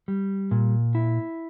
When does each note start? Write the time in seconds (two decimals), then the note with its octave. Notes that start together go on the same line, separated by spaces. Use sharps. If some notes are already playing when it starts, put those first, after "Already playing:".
0.08 G3
0.51 A#2
0.95 E4